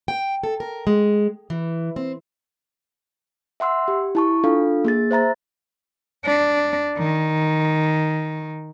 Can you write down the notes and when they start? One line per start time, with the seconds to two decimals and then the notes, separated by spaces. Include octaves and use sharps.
0.08 G5
0.43 A4
0.60 A#4
0.87 G#3
1.50 E3
1.96 C4
3.60 E5 F#5 C6 E6
3.88 G4
4.15 E4 A5 C#6
4.44 D4 F4 A4 F5
4.85 A#3 G#4 A6
5.11 C5 E5 A#5 A6
6.25 D4
6.98 D#3